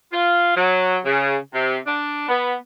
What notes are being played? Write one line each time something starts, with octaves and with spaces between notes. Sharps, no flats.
F4
F#3
C#3
C3
D4
B3